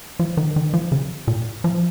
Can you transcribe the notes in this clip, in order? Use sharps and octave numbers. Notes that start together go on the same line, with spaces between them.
F3
D#3
D#3
F3
C#3
A#2
F3